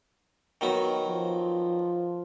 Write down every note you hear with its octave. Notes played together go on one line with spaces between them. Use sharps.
D#3 F#3 B3
F3